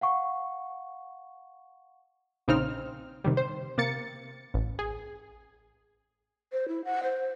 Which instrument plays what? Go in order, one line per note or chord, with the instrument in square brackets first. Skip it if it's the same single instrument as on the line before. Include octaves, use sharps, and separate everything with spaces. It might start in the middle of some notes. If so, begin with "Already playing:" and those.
[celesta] F5 F#5 C#6
[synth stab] A#1 C#3 C4 D#4 F6
C3 D#3 G3
C5
C3 A#3 A6 C#7
A1
G#4
[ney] C5
E4
F#5
C5